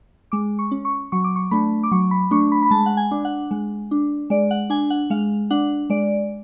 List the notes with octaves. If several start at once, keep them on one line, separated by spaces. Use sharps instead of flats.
G#3 D6
C#6
C#4
C#6
F#3 C#6
D6
C#6
A3 D4 B5
D6
F#3 C#6
B5
A3 D4 C#6
B5
B5
G#3 A5
F#5
G#5
D4
F#5
G#3
D4
G#3 D5
F#5
D4 G#5
F#5
G#3 F5
D4 F#5
G#3 D5